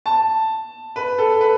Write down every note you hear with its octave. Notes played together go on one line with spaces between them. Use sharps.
A5
B4
A4
B4